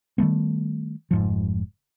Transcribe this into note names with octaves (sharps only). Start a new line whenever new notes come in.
D#3 G3 A3 B3
F1 G#2 F3